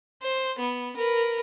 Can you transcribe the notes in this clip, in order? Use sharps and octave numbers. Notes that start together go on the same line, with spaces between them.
C5
B3
A#4 B4